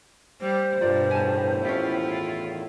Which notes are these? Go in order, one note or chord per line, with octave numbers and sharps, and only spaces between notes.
G3 C5
G2 B2 F4 A#4 D5
E2 A2 D#3 G#5 A5
C#4 D4 E4 F4 G4